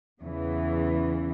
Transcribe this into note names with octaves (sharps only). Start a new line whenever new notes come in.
E2 C#3 E3